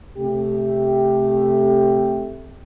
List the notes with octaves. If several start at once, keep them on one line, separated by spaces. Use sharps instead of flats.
C3 A3 G4